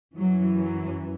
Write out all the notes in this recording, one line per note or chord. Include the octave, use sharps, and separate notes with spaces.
F#2 E3 F#3
F#3